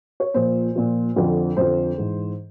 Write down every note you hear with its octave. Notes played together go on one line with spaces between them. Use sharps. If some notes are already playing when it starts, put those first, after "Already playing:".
C#5
A#2 F3 C5
A#2 F3
F2 D3 F3
F2 D3 F3 C5
G#2 E3